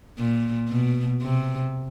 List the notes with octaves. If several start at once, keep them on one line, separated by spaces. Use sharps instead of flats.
A#2
B2
C3